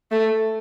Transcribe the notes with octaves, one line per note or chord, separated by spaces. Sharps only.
A3